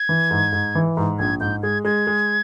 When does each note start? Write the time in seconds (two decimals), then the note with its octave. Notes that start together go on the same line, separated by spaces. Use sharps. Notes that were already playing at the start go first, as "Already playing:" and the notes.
Already playing: G#6
0.09 E3
0.31 G#2
0.53 G#2
0.75 E3
0.97 G#2
1.19 A#1 G#6
1.40 G#2 G6
1.63 G#3 G#6
1.85 G#3 G#6
2.07 G#3